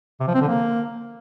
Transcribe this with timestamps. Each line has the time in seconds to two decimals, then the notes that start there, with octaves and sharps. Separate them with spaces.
0.21 C3
0.28 F3
0.35 C4
0.41 D3
0.48 A#3